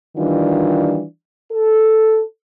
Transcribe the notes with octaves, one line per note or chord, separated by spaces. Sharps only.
D#3 E3 G3 D4 F4
A4